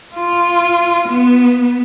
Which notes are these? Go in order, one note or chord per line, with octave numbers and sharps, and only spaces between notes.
F4
B3